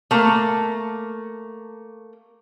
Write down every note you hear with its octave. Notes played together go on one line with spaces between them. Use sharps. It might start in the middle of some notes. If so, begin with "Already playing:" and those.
A3 A#3